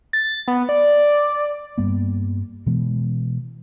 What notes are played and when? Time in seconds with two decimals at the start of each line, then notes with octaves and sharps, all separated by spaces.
0.13 A6
0.48 B3
0.69 D5
1.78 G2 G3 A#3 B3
2.66 B2 E3 G#3 B3